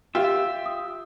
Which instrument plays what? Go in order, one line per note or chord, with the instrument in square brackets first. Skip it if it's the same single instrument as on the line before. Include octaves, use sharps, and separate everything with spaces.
[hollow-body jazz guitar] F4 [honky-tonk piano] G4 [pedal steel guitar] E5 [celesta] G5
[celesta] D#6